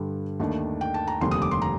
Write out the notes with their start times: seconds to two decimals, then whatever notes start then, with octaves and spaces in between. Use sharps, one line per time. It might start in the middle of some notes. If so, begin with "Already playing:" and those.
Already playing: G2 D3 G3
0.40 D#2 D#3 A3 D4
0.81 G5
0.94 A5
1.07 A#5
1.21 F1 D#2 D3 G3 C4 C6
1.31 D#6
1.42 D6
1.51 C6
1.62 A#5